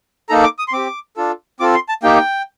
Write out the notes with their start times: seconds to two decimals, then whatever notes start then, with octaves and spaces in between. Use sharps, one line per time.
0.29 A#3 D#4 A4 A#5
0.44 D6
0.59 D#6
0.68 C6
0.72 C4 G4 D6
1.16 D4 F4 A4
1.60 C4 F4 A4 D6
1.75 C6
1.89 A5
2.03 A#3 D#4 G4 G5